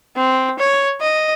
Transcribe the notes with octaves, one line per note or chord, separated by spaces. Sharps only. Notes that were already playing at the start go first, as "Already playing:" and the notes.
C4
C#5
D#5